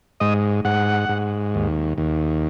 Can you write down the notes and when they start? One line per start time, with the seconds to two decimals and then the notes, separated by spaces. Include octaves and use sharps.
0.20 G#2 D#5
0.65 G#2 F#5
1.09 G#2
1.55 D#2
1.98 D#2